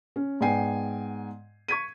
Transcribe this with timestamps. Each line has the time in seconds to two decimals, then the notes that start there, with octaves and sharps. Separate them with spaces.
0.16 C#4
0.41 G#2 B3 D5 G5 G#5 C7
1.68 C#6 G#6 B6 D#7